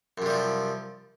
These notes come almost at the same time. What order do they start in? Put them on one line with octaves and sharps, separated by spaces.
F#2 C3 G3 F3